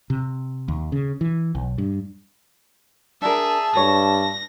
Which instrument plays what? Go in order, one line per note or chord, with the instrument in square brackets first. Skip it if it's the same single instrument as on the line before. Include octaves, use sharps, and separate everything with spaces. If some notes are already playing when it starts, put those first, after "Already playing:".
[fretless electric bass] C3
D#2
C#3
E3
B1
G2
[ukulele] D4 A#4 [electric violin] G#4 E5 [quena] A5
[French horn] G2 [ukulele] A4 C#5 [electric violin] A#6